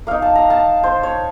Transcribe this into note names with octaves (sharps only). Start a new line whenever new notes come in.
A#3 D#4 F5
A5
A#5
A5
C5
C#5